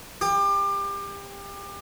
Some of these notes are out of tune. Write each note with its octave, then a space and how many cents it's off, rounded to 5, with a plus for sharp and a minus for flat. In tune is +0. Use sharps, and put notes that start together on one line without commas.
G4 +30